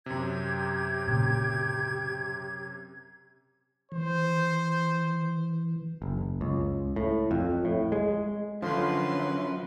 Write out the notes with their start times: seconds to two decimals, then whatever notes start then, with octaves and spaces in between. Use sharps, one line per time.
0.06 F#2 C3 G4 G#6
1.08 A#2 C#3
3.92 E3 C5
6.02 F#1
6.41 C#2
6.96 A2
7.31 F2
7.65 A2
7.92 G#3
8.63 F#2 D3 F3 D4 B4 C6